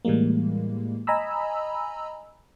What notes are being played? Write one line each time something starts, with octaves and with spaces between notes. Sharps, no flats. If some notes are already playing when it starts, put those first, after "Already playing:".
A2 E3 G3 G#3 A#3
D#5 G#5 A#5 B5 E6